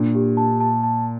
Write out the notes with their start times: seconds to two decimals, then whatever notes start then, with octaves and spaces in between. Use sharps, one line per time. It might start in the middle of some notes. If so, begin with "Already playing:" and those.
Already playing: A#2 D4
0.15 G4
0.37 A5
0.60 A5
0.83 A5